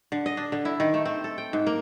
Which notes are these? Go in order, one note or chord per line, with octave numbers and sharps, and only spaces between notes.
D3
D#5
D4
D3
E4
D#3
A3
C4
A4
G5
G#2
A#3